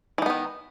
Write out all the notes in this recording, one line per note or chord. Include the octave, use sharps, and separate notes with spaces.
D#3 E3 B3 D#4